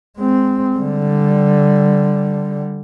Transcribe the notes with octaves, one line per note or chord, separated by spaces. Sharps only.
G#3 C4
D3 G3